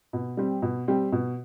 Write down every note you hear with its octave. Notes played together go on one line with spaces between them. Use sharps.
B2
G3 C4 G4
B2
G3 C4 G4
B2